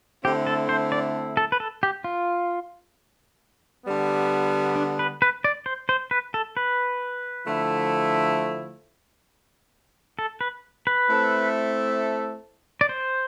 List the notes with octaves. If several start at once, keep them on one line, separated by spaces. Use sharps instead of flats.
D3 A3 C4 E4 G4
A4
C5
D5
A4
B4
A4
G4
F4
D3 G3 B3
D4
B4
B4
D5
C5
C5
B4
A4
B4
D3 F3 A3 E4
A4
B4
B4
A3 C4 E4 A4
D5
C5